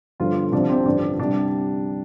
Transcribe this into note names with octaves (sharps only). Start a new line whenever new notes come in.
G1 G2 D3 F3 F4
C2 C3 F3 D4
C4
A1 G2 D3 F3 D4
C2 C3 G3 D4